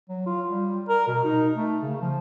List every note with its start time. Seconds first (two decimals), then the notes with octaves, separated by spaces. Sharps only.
0.09 F#3
0.27 F4
0.50 G3
0.89 A#4
1.07 B2
1.24 D#4
1.56 A3
1.81 C#3
2.02 F3